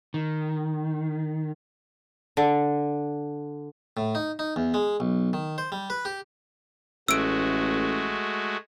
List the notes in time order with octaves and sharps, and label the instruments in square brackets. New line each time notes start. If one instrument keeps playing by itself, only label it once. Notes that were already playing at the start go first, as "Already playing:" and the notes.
[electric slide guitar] D#3
[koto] D3
[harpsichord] A2
D#4
D#4
E2
G#3
B1
D#3
C5
G3
B4
G4
[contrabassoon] A1 [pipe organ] G#3 A3 F#4 [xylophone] E6 D7